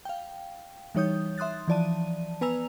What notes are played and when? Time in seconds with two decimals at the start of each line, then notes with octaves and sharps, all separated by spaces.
0.05 F5 G5
0.95 E3 G3 D#4 C#5 D#6 G6
1.38 E5 C6 D#6 F#6 A6
1.68 E3 F3 D5 A5 D#7
2.41 B3 B4 G#5 A#5 E6 F7